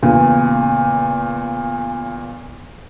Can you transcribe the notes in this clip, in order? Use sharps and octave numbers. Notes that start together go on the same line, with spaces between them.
E2 A#2 C#3